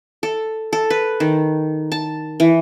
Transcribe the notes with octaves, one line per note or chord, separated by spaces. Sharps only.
A4
A4
B4
D#3
A5
E3